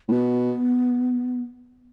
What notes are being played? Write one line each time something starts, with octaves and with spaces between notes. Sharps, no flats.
A2
B2 B3